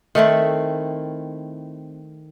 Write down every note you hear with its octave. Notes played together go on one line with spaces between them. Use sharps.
D#3 A3 C4 E4